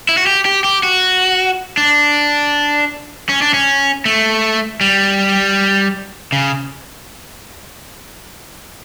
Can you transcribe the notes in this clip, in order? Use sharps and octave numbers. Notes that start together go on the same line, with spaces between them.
E4
F#4
G4
G4
G4
F#4
D4
C#4
D4
C#4
A3
G3
C#3